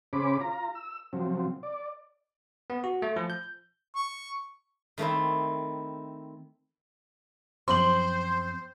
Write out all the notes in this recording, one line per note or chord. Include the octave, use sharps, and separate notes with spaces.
C#3 C#4 G#4 C5 B5 D6
F4 A#5
E6
C3 F3 F#3 C4
D5
B3
F#4
A3
F3
G6
C#6
D#3 A3 C4 E4
F#2 F3 C4 C5 C6 F#7